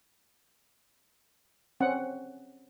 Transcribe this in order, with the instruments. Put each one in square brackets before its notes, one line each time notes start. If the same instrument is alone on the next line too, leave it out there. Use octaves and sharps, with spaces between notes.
[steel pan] C4 C#4 F#5